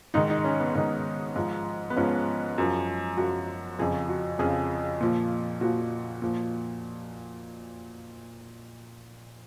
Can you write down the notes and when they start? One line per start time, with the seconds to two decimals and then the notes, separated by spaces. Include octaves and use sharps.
0.14 G#2 D#3 D#4
0.30 D#4
0.44 C#4
0.60 B3
0.75 G#2 D#3 B3
1.36 G#2 F3
1.90 B3
1.96 G#2 F3 C#4
2.58 F#2 F3
3.17 F#2 F3 F#4
3.79 F2 C#3 F3 G#4
4.09 F#4
4.39 F2 C#3 F3 G#4
5.01 A#2 F3
5.61 A#2 F3 F#4
6.22 A#2 F3